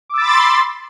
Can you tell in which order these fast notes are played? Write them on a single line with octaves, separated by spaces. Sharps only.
D6 E6 A6 B5 C6